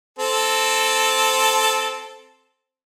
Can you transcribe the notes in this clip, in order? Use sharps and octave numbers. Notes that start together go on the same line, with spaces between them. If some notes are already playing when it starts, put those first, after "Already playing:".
C4 A4